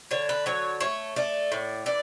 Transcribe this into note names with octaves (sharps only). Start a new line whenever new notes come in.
D3 C#5
B4
F#3 C#5
A3 C#5
A3 D5
A2
E3 D5